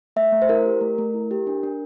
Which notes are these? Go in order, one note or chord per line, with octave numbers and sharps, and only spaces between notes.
A3 E5
A3
C5
E4 A#4
G4
A3
A3
E4
G4
D4
D4